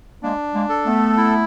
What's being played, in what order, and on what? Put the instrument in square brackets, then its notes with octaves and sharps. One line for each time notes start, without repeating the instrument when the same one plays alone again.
[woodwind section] G#3 A#3 [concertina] D4
[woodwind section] G#3 A#3
[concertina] A4
[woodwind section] A3 B3
[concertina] E4